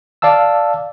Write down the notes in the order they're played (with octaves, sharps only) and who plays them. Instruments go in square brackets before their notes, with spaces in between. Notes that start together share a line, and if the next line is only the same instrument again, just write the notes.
[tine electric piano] D5 F5 A5 E6